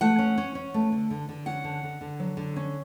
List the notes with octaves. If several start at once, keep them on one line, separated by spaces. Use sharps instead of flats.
A3 F#5
C#4
C#4
C#4
A3
D3
D3
D3
C#4 F#5
D3
D3
D3
F#3
D3
C#4